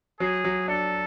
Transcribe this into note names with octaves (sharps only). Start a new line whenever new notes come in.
F#3 G#4
F#3
D4 A4